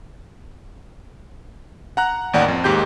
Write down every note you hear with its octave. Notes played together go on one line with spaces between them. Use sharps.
F#5 A#5 F#6
A1 D#2 D5 F#5
F2
D#2 G#2 G4 G6